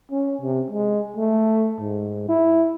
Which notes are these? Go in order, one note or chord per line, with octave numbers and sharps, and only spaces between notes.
C#4
C3
G#3
A3
G#2
E4